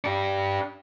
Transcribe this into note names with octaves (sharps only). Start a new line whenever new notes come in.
D4 G4